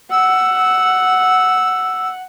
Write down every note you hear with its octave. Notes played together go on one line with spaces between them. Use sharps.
F#5 E6